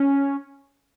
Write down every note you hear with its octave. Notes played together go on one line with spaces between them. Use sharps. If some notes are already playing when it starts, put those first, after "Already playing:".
Already playing: C#4